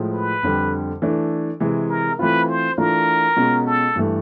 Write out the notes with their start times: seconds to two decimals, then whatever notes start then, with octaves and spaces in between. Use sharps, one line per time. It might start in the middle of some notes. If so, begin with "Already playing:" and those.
Already playing: A2 F3 G#3
0.14 B4
0.43 F2 D3 G3
1.02 E3 A3 D4
1.60 C3 E3 G#3
1.89 A#4
2.19 E3 A3 C4 F4 B4
2.49 C5
2.78 E3 A3 D4 F4 A#4
3.37 B2 G#3 C#4 F4
3.67 A4
3.96 G2 E3 A3